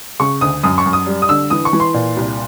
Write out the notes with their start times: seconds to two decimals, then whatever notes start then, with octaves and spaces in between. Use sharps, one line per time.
0.20 C#3 C#6
0.41 D2 D#6
0.63 F#2 D#6
0.78 C#6
0.86 F#2
0.93 D#6
1.07 G3
1.22 D#6
1.29 D3 E6
1.50 E3 D#6
1.65 C#6
1.73 E3
1.80 C6
1.94 A#2
2.17 C2